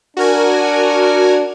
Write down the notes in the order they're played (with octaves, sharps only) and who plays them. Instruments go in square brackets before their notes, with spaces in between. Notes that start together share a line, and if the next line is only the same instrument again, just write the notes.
[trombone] D4 [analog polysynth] F#4 A#4 G#5